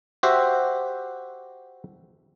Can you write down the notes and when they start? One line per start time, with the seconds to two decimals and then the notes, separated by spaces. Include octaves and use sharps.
0.23 F#4 G4 C5 E5